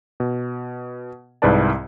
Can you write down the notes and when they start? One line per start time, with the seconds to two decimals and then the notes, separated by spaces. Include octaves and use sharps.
0.20 B2
1.42 C2 G#2 E4 B4 D5 A5